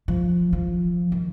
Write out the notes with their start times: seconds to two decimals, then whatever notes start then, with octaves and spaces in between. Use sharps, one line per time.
0.08 F3
0.53 F3
1.12 D#3